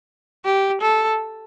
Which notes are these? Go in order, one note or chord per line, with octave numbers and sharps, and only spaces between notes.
G4
A4